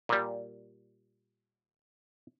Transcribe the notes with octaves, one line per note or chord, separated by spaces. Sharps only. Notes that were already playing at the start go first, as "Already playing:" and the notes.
A#2 G3